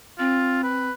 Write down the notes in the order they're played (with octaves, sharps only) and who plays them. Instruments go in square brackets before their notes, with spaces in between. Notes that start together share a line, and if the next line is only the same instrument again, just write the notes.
[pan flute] C4 [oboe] F4
[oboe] B4